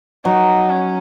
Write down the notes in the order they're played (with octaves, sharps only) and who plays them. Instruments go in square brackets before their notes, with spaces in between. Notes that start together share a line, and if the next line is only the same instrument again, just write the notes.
[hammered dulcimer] F#3 [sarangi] D#4
[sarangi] C#4